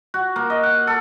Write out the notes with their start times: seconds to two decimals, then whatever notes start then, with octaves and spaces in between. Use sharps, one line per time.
0.14 F#4
0.36 A#3
0.50 D#5
0.63 F#5
0.87 A4